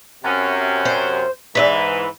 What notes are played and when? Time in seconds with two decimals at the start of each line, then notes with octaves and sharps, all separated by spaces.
0.24 F#2 C3 C#4
0.85 C5
1.55 G#2 E3 B4 C#5 E5